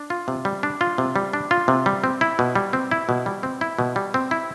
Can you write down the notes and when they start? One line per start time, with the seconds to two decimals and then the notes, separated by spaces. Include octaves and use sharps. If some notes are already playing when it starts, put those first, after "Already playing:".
Already playing: D4
0.10 F4
0.28 C3
0.45 G3
0.63 D4
0.81 F4
0.98 C3
1.16 G3
1.33 D4
1.51 F4
1.68 C3
1.86 G3
2.04 C4
2.21 E4
2.39 B2
2.55 G3
2.73 C4
2.91 E4
3.09 B2
3.26 G3
3.43 C4
3.61 E4
3.79 B2
3.96 G3
4.14 C4
4.31 E4